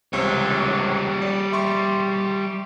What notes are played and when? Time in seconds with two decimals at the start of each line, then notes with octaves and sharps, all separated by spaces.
0.13 C#2 C3 G3 C#5
1.22 D5
1.52 E5 C6 C#6